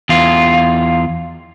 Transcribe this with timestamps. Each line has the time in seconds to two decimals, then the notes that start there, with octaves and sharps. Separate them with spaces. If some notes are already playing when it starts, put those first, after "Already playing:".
0.09 E2 F4